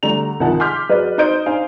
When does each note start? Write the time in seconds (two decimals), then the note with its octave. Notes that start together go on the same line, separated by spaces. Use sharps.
0.03 D3 G3 A3 A#5 F7
0.40 C2 D#3 F3 D#4 F#5 A5
0.60 C6 D6 F6 G6 B6
0.89 F#3 G#4 B4 D5 D#5
1.18 D#4 C5 D#5 D#6 G6 D7
1.46 D4 D#4 C5 F5 G#5